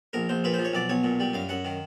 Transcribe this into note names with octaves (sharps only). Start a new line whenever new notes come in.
A#1 A#4
A#1 C5
A#2 B4
F3 C5
C#5
B1 D5
B1 C#5
A#2
G3
F#2 F5
F#2 F#5
D#3